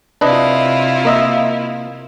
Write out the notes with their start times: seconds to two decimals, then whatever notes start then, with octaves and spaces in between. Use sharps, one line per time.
0.21 C3 D4 E4 F4 B4 D#5
1.05 A#3 D#5 E5